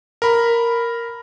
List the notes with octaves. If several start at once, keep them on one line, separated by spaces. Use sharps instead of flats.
A#4 B5